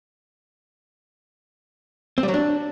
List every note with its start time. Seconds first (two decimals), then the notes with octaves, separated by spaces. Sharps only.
2.18 C4
2.23 G3
2.28 F#3
2.34 D4